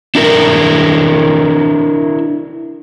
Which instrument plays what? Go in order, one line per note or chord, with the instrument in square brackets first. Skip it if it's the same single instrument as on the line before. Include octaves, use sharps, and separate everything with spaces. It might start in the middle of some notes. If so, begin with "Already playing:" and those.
[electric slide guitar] D4 E4 A#4